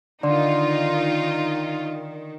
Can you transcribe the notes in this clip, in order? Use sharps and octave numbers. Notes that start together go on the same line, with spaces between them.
D3 D#3 D#4 F4 D5 C6